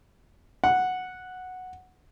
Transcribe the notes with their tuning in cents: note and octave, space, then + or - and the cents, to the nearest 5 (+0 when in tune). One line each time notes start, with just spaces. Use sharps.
F#5 -5